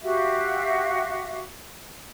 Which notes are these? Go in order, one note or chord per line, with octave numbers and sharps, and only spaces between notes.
F#4 G4 E5 F5